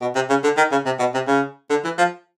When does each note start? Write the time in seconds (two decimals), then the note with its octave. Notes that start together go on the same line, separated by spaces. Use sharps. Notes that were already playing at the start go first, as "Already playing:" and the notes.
0.01 B2
0.15 C3
0.30 C#3
0.44 D3
0.57 D#3
0.71 C#3
0.86 C3
0.99 B2
1.14 C3
1.27 C#3
1.70 D3
1.84 E3
1.98 F3